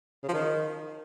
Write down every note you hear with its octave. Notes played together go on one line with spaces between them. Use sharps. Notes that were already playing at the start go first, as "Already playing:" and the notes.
C#3
F3
D#3